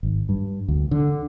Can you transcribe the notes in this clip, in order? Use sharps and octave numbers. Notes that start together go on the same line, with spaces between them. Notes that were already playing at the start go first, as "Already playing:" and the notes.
G#1
G2
D2
D3